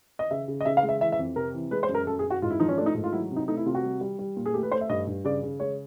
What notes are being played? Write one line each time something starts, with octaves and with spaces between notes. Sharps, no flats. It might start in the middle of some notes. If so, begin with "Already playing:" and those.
D#5
C#3 E5
C#3
D#5
C#3 E5
F5
G#3
E5
E3 E5
E5
F2
C3 A#4
E3
G#3 B4
C5
F#2
A#4
F#2 A4
G#4
F#2
F#4
G#2 F4
E4
F3 D#4
C#4
A3 D4
D#4
G#2
F4
F#3 E4
C3
D#4
A3 D#4
E4
C3 F4
F#4
G3
G3
G3
A#2
G#4
A3 G4
B4
A3 C5
E5
G2 D#5
G2
C#3 D5
C#3
G#3 C#5